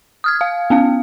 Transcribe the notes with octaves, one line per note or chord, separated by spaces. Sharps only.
D#6 F6 G#6
F5
B3 C#4 F5